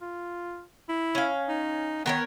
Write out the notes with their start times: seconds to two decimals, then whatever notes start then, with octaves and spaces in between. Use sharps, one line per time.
0.02 F4
0.89 E4
1.15 C#4 F5
1.49 D#4
2.06 D#3 B3 A#4 C#5